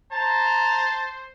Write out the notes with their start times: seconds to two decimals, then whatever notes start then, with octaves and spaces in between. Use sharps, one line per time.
0.12 C5 A5 A#5